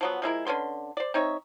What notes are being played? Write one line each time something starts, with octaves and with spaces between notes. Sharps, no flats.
F3 F#3 B3
F3 G#3 E4 A#4
D3 C#4 B4 C6
C5 D5
C4 D#4 C#5 E5